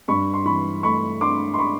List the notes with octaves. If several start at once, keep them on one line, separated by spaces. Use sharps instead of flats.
G2 B5 C#6
C6
E3 B5 C#6
A3 B5 C#6
D4 C6 D6
C6
B5 C#6